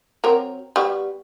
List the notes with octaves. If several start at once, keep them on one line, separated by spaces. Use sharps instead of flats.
F#3 C4 A#4
G3 B3 F#4